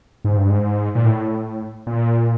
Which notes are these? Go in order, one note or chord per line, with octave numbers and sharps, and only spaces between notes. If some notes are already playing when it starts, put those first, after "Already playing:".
G#2
G2
G#2
A#2
A2
A#2